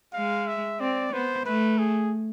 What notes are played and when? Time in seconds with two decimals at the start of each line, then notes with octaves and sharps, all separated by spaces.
0.13 G#3 F5
0.47 E5
0.79 C4 D5
1.13 B3 C5
1.45 A3 B4
1.78 G#4